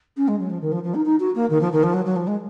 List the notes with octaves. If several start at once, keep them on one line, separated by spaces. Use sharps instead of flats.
C#4
G#3
F#3
F3
D#3
F3
F3
D#4
D#4
F#4
A#3
D#3
F3
D#3
F3
F#3
F#3
F3
G#3